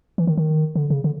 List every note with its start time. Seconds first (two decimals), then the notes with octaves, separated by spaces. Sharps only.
0.18 E3
0.27 D#3
0.37 D#3
0.75 D3
0.90 C#3
1.04 D3